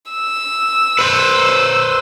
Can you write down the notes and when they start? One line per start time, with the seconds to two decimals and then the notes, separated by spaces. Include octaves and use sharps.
0.11 E6
0.99 B4 C5